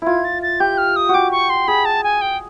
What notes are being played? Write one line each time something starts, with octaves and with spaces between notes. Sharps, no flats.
E4 F4 G#6
A6
A6
G4 G6
F6
D#6
F#4
G4 D6
C#6
C6
G#4 B5
A5
G#5
G5